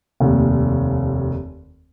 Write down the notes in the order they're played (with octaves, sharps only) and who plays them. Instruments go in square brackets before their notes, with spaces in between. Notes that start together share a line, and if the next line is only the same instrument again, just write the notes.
[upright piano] F1 D#2